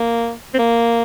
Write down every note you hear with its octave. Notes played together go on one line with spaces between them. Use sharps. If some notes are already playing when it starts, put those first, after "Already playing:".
Already playing: A#3
C4
A#3